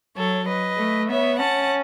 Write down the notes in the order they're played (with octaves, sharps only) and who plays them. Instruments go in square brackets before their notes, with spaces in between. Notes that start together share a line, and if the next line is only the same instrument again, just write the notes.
[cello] F#3 [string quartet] A4 C#5
[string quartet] B4 D#5
[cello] A3
[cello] B3 [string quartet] C#5 E5
[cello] C#4 [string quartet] F#5 A5